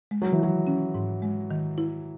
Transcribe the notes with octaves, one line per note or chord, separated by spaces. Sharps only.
G#3
F#3
E3
D#3 F#3
C#4
G#2
G#3
D#3
E4